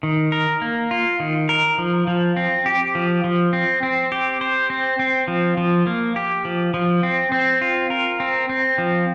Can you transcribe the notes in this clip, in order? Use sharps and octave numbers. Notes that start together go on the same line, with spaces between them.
D#3
A#4
A#3
F4
D#3
A#4
F3
F3
C4
G4
F3
F3
C4
C4
G4
C5
C4
C4
F3
F3
A#3
G4
F3
F3
C4
C4
F4
A#4
C4
C4
F3